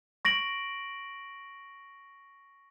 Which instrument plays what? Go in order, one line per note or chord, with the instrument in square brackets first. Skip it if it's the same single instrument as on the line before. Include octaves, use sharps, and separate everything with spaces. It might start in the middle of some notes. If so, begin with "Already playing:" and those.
[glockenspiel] C#6 A#6 D7 F#7